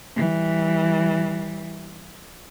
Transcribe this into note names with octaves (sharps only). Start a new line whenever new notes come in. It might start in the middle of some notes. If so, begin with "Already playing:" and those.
E3 G3